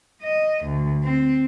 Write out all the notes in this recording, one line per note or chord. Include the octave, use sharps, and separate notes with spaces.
D#5
D2
C4